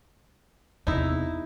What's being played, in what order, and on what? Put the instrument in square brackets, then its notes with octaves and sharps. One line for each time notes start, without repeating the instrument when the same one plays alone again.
[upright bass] E2 C3 [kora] D#4 E4